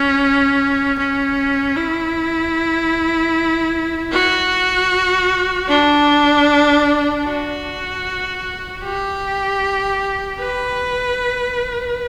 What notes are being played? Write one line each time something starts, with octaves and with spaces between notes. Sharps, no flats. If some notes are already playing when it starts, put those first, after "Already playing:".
Already playing: C#4
C#4
E4
F#4
D4
F#4
G4
B4